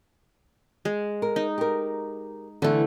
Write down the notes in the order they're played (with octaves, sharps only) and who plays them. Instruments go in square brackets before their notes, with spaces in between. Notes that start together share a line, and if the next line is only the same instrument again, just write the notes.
[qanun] G#3
[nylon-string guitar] A#4
[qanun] D#4
[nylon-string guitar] G4 A#4
[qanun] D3 A3 [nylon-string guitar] E3 B3